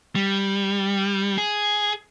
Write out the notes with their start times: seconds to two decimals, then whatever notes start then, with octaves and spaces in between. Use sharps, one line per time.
0.16 G3
1.37 G#4